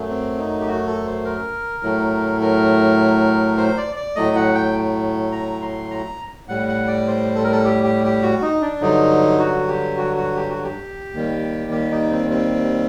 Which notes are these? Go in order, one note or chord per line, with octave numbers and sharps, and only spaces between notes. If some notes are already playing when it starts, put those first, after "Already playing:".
Already playing: F#2 F#3 A3
C4
D#4
G4
F#4
A4
C5
A#4
A2 F#3 A3
A#4
C5
D5
D5
A2 F#3 A3 D#5
F#5
G5
A#5
C6
A#5
A2 G3 F#5
F#5
D5
C5
A4
A#4
A4
G4
G4
G4
F#4
D#4
D4
G2 D3 F#3 D#4
F#4
G4
F#4
F#4
G4
F#4
G4
D#2 D#3 G3
G4
D#4
C4
C4